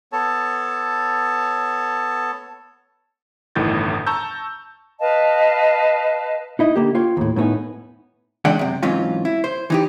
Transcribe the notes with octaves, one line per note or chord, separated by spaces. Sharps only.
B3 A4 C#5 A5
G1 E2 A2 D#3 G6 A6
A5 A#5 C#6 E6 G6
B4 D#5 F5 A5
D#4 E4 D#5
D3 A#3 G4
F4 C#5 G5
D#2 A2
A2 A3 B3 D#4 G#5
E2 E3 G#3 D4 F#5 G5
F#2 C3
G#2 E3 F#3 C4 C#4 F4
E4
C5
E3 D#4 G4